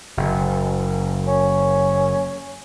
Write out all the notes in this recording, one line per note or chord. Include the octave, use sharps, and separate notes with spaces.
F#1
C#4